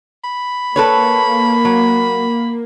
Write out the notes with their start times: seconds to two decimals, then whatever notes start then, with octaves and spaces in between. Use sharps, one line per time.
0.24 B5
0.76 A#3 A4 B4 C#5
1.65 F#3